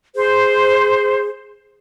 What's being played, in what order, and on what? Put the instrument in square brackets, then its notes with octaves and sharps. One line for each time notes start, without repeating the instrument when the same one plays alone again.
[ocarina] G#4 [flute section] C5